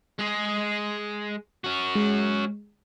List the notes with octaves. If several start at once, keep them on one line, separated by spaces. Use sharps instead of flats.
G#3 G#4
C#4 F#4
G#3